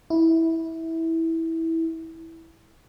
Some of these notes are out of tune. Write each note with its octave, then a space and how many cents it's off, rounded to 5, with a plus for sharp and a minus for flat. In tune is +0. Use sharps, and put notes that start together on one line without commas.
E4 -15